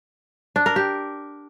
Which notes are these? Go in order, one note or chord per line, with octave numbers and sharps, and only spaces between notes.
D4
A#4
G4